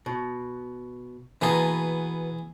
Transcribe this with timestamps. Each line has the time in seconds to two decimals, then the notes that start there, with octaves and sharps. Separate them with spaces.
0.06 B2
1.42 B2 E3 A#3 B3 G#4